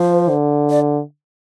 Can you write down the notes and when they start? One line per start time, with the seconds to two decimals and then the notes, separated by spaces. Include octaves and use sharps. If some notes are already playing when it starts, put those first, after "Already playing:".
Already playing: F3 C5
0.29 D3
0.70 D5